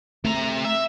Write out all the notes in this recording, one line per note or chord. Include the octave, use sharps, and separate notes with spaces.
C3 A3 A#5
E5